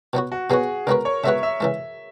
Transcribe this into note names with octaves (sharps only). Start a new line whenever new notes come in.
B2 F#3 B3 F#4
F#4
B2 F#3 B3 F#4 G#4
C#3 G#3 B3 F#4 A#4 B4
C#5
C#3 G#3 B3 F#4 B4 E5
E5
C#3 E3 G#3 E5